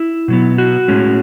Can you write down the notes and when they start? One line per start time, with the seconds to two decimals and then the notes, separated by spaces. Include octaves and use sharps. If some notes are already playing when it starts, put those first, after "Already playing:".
Already playing: E4
0.28 B2 F#3 B3
0.58 F#4
0.88 A2 G#3 C#4